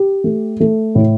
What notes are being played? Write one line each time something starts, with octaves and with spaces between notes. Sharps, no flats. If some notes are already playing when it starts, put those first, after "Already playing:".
Already playing: G4
A3
A3
A2